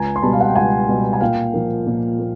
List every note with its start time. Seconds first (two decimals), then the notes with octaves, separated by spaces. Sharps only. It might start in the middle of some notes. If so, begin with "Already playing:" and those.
Already playing: C#2 G#5 A#5
0.16 C6
0.22 B2 G3 B3 A5 B5
0.33 F5
0.40 F#5
0.48 G5
0.55 C#2 F#5 G#5
0.88 B2 G3 B3
1.13 G#5
1.21 A#2 F5 G5
1.54 F3 A#3
1.86 A#2
2.19 A#3